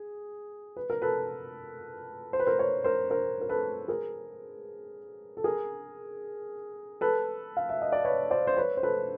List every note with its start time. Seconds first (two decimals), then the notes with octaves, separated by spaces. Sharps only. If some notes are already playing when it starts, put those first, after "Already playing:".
Already playing: G#4
0.77 B4
0.90 A#4
1.02 A4 B4
2.33 C5
2.40 B4
2.46 A#4 C5
2.58 B4 C#5
2.84 A#4 C5
3.10 A#4 C5
3.41 A#4
3.49 A4 B4
3.88 G#4 A#4
5.37 A4
5.44 G#4 A#4
7.01 A4 B4
7.57 F5
7.69 E5
7.82 D#5
7.92 D5
8.05 B4 C#5
8.31 C5 D5
8.47 C5
8.56 B4 C#5
8.77 C5
8.83 A4 B4